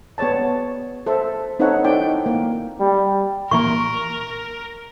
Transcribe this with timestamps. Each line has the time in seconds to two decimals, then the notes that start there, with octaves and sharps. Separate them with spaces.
0.18 B3 G#4 C#5 D5 A5
1.06 A4 C5 E5
1.59 C4 D#4 A4 B4 C#5 F#5
1.84 C4 D#4 E4 A4 D5 G5
2.26 A#3
2.80 G3
3.51 A#2 E3 A#3 A#4 C#6